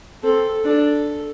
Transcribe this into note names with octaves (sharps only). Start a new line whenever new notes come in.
C4 A4
D4 A4